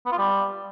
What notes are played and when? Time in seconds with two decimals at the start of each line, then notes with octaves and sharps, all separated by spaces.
0.06 B3
0.12 F4
0.18 G3